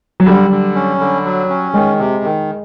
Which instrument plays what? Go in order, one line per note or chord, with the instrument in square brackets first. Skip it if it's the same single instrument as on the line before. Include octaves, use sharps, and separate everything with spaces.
[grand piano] F#3
[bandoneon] D3 [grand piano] G3
[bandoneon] D3
C#4
D3
F#3
C#4
[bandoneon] D#3 [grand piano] G#3
[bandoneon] C3
D#3